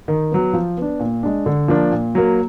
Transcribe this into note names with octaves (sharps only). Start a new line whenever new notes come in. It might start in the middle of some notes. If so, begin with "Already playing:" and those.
D#3
F#3 B3
F3
B3 D4
A#2
G#3 D4
D3
F3 A#3 D4
A#2
F#3 A#3